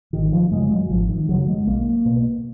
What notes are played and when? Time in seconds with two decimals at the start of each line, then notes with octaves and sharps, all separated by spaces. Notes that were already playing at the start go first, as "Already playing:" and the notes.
0.13 G#1 D#3
0.32 F3
0.51 F#2 C#3 G#3
0.71 F#3
0.90 G#1 F3
1.09 D#3
1.29 F#2 C#3 F#3
1.48 G#3
1.67 B1 A#3
2.05 B2